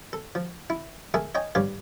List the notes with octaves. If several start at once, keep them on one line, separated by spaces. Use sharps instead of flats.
A4
F3
E4
A3 G#4 A#4 E5 A5
C#5 D#5 G5 G#5
G2 G3 C#5 D5 F5